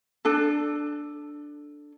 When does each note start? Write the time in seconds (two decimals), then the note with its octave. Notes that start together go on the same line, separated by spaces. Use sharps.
0.25 D4 A4